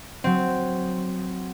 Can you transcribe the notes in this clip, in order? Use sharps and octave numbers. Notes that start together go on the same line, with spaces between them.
F#3 C4